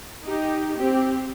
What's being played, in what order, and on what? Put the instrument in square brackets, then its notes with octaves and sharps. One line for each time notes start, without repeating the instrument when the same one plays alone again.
[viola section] D#4 G4
C4 G4